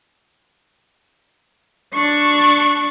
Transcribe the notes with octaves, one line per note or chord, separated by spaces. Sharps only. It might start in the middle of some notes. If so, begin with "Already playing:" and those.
D4 C#6